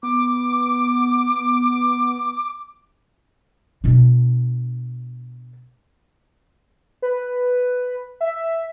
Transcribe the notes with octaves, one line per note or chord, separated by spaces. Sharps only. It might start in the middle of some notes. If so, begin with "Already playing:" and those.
B3 D6
B2 D4
B4
E5